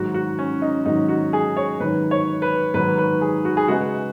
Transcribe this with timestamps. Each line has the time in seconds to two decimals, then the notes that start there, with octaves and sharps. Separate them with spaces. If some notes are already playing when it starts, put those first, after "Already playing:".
Already playing: G#2 D#3 F#3 F#4
0.14 F#4
0.39 C#4
0.62 D#4
0.86 G#2 D#3 F#3 D#4
1.09 F#4
1.33 G#4
1.57 C#5
1.80 G#2 D#3 F#3 B4
2.11 C#5
2.42 B4
2.74 G#2 D#3 F#3 B4
2.98 B4
3.21 G#4
3.45 F#4
3.57 G#4
3.68 C#3 G#3 D#4 F#4 B4 D#5